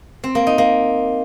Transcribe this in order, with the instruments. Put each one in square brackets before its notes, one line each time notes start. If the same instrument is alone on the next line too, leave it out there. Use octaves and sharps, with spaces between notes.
[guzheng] C4
A#3
D#4
A#3